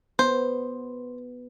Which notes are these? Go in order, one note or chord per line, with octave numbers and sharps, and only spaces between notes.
B3 C5